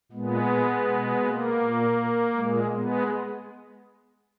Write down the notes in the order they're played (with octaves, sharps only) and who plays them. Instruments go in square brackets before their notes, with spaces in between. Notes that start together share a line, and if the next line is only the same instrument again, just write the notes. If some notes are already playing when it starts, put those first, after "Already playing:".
[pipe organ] A#2 G#3 B3
B2
A#3
A#2
A#2 G#3
G#3 B3